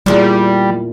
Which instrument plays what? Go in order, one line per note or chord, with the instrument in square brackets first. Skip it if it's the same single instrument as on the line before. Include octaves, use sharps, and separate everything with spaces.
[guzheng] E2 A#2 [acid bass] G3